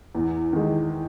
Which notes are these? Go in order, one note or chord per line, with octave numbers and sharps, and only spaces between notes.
E2
D#3 G#3